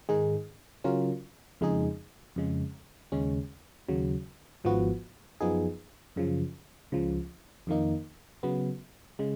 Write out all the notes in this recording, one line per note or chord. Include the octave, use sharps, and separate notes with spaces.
G#2 D#3 G#3 D#4 G#4
C#3 F#3 C#4 F4 A#4
F2 C#3 G#3 D#4 G#4
F2 C#3 G#3
D#2 C#3 G#3 C#4
D#2 C#3 F#3
G#1 G#2 F3 B3 F#4
F#2 F3 B3 D#4 G#4
F#2 C#3 F3
C#2 C#3 F3
F2 D#3 A#3 D#4
C#3 F#3 B3
C#3 G#3